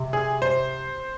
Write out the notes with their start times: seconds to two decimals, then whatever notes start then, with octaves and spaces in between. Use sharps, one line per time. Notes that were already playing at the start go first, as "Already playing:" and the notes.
Already playing: C3
0.13 G#4
0.42 C5